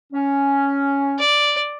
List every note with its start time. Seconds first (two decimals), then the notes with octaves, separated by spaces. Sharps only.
0.13 C#4
1.19 D5